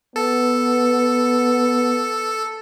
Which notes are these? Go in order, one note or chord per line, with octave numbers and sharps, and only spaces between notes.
B3 A4